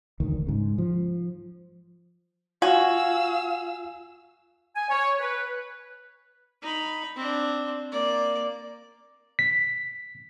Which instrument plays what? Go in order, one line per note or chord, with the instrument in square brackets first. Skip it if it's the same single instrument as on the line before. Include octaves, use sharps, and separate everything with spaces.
[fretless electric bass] E1 D2 D#3
G#2 C#3
F3
[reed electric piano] F4 G#5 [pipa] F#4 [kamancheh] F5 E6
[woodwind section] G#5
C#5
B4
[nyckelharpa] D#4 B5
C4 D4
A#3 D5
[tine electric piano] B6